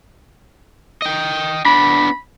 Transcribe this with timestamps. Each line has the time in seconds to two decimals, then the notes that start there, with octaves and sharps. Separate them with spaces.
1.02 D#5 G5
1.66 B3 D4 B5